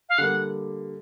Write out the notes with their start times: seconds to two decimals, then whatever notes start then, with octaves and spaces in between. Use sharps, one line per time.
0.09 F5
0.18 D3 G3 A#3 F#5